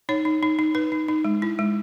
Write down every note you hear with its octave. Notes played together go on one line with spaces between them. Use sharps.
D#4 C#5
D#4
D#4
D#4
D#4 B4
D#4
D#4
G#3
E4
G#3